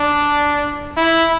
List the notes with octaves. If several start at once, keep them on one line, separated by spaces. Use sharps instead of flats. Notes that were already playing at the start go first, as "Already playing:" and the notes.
Already playing: D4
E4